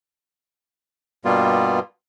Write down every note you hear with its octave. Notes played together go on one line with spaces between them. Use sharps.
G2 B2 G3 A#3 B3 F4